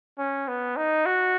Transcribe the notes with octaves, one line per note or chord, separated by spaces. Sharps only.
C#4
B3
D#4
F#4